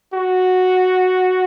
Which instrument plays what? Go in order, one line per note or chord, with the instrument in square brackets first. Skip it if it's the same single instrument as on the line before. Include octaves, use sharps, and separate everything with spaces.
[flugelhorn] F#4